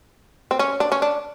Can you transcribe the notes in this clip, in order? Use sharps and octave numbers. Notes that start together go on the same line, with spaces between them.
C4
C#4
D4
C#4
D4